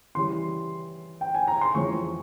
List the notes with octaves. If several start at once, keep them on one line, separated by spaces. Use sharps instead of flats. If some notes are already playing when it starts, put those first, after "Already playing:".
C#3 E3 G3 C6
G5
G#5
A#5
C6
F2 E3 G#3 C#4 C#6